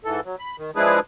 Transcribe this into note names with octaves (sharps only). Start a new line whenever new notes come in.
G#2 E3 A4
F#3
B5
D#3
F3 G#3 D4 E4 G#4 B4